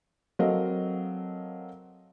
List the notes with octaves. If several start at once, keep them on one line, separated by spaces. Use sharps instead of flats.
F#3 C4 A4 A#4 D#5 F5